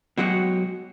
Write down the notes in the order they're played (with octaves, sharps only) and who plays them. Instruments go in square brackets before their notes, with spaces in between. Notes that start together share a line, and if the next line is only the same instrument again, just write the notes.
[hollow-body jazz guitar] B2 F#3 G#3 F#4 G4